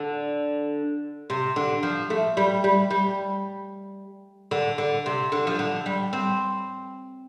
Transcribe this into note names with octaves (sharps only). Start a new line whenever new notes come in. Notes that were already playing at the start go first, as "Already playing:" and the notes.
Already playing: D3
C3
D3
F3
A3
G3
G3
G3
D3
D3
C3
D3
F3
D3
G3
C4